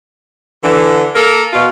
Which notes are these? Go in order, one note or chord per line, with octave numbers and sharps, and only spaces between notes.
D3 E3
A#3 A4 A#4
B2 F4